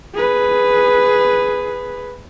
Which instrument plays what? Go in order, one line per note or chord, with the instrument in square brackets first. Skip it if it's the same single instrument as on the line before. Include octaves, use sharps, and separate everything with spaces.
[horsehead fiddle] G#4 B4